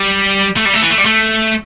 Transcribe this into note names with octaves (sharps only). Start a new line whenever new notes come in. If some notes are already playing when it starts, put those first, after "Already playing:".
Already playing: G3
A3
G3
A3
E3
A3
G3
A3